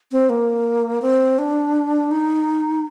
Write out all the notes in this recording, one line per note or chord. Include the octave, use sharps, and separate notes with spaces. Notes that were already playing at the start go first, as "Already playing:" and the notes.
C4
A#3
C4
D4
D#4